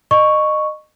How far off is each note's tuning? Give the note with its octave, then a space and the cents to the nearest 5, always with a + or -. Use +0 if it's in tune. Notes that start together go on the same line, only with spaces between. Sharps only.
D#5 -25 C#6 +0